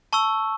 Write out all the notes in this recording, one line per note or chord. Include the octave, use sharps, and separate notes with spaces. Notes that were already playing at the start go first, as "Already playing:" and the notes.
A5 C#6 E6